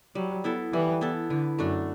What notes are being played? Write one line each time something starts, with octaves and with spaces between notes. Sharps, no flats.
F#3 G3
B3 E4 A4
E3 G3
B3 E4 A4
D3 E3
F#2 A3 D4 F#4